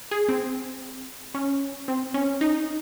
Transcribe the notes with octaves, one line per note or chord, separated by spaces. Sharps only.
G#4
C4
C#4
C4
C#4
D#4